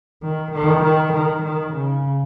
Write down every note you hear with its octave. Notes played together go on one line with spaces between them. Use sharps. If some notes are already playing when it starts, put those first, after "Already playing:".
D#3
D#3
D#3
D#3
D#3
C#3